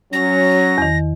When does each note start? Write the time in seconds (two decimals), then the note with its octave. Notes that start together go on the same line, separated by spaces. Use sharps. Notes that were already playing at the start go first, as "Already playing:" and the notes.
0.13 F#3 C#4 A#6
0.78 E2 D#3